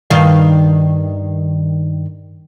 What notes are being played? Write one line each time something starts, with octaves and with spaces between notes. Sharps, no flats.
G2 D#3 F5